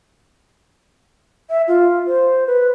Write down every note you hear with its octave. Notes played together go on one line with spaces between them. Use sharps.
E5
F4
C5
B4